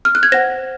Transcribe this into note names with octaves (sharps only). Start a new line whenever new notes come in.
F6
F#6
G#6
C5 F#5 A#6